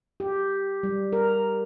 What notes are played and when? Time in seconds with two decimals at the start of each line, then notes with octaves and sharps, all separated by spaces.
0.20 G4
0.83 G3
1.13 A#4